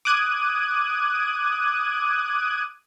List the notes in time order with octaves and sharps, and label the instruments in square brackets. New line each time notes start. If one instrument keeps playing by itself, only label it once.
[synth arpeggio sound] D6 D#6 F#6 G#6 D#7